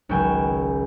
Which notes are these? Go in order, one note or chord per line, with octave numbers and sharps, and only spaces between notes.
G#1 C#2 F#3 G5 G#5 E7